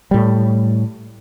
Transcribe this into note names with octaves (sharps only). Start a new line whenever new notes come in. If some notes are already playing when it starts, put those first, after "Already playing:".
A2 G3